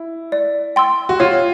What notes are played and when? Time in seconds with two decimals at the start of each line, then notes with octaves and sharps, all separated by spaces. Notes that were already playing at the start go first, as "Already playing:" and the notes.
Already playing: E4
0.32 D5
0.76 G5 C6 E6
1.09 F#4
1.20 F4 C#5